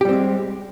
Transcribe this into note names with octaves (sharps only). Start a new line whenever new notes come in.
G3 G#3 C4 G4